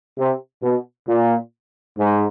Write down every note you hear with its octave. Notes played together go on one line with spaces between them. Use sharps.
C3
B2
A#2
G#2